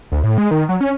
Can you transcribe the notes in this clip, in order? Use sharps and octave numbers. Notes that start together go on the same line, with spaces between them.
D2
A2
G#3
D#3
F#3
C#4